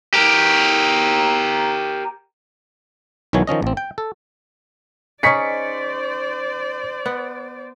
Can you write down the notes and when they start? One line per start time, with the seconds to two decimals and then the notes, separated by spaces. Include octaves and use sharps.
0.14 G4 A#4
3.33 B1 D#3 E3 F#3 C#5 G#5
3.47 D#3 F3 C#4 D#5
3.62 A1 C4
3.77 G5
3.98 A4
5.23 C#4 D#4 G#4 C5 D5 C#6 B6 C#7
7.06 B3